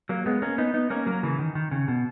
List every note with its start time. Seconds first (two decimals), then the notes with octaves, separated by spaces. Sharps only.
0.09 F#3 A#3
0.26 G#3 B3
0.42 A#3 C#4
0.58 B3 D#4
0.74 B3 D#4
0.90 A#3 C#4
1.06 F#3 A#3
1.23 C#3 E3
1.39 D#3
1.55 D#3
1.71 C#3
1.88 B2